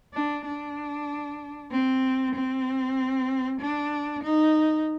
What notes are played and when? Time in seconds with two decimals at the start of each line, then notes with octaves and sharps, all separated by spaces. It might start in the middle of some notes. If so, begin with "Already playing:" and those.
0.14 D4
0.45 D4
1.72 C4
2.35 C4
3.60 D4
4.23 D#4